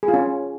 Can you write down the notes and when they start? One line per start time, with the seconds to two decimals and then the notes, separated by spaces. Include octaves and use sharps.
0.03 G#4
0.08 F4
0.14 C#4